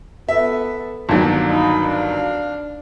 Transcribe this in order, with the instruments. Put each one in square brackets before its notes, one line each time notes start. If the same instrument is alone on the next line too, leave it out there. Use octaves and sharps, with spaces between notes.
[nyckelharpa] B3 A4 [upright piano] E5
[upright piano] G1 D#2 F#3 [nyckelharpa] D5
[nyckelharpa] D#4 B5
D4 F5